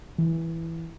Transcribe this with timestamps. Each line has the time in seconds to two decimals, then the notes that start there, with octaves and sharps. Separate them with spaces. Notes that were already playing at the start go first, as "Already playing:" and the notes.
0.18 E3